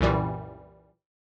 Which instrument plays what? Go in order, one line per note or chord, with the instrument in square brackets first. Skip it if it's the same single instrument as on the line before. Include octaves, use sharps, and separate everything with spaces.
[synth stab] C2 F#2 A#2 E3 G3